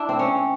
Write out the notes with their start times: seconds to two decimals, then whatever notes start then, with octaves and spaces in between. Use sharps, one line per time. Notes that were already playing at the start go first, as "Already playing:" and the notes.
Already playing: D4 E4
0.09 C4
0.19 C#4